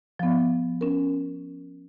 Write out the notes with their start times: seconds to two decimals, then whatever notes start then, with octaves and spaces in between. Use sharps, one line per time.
0.19 F3 B3
0.81 C#4 A#4